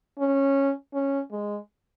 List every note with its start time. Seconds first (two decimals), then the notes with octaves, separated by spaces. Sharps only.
0.19 C#4
0.94 C#4
1.32 G#3